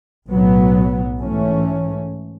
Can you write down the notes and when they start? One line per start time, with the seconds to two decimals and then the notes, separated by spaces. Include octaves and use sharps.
0.28 B1 A2 F#3 B3
1.19 G#2 E3 A3 C#4